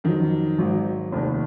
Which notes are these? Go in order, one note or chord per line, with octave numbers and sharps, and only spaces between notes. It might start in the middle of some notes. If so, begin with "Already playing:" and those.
F2 D#3 F#3
G#1 G#2 F#3
F1 D#2 D#3